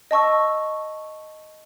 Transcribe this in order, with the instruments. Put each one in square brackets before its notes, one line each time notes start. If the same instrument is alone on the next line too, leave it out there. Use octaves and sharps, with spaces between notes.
[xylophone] D#5 A5 C#6 E6